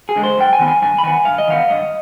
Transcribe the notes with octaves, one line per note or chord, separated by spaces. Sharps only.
G#4
D3 G#3
C5
G2 G5
G#5
D#3 B3
G#5
G2 G#5
B5
D#3 B3 G#5
G2 F5
D#5
D#3 B3 F5
G2 D#5